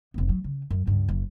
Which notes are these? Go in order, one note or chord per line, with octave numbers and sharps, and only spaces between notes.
F1 B3
F#3
C#3
F#2
C#2 G2
F#1